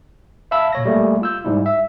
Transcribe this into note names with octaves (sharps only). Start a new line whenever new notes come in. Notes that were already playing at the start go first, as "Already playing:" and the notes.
E5 F5 A5 B5 E6
A#2 C#5 A#6
G3 A3 A#3 G4
F4 E6 G6
G#2 G3 E4
E5